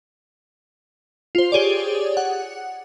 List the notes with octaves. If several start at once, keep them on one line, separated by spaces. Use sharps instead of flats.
F4 C5
G4 G#4 C#5 D5
F#5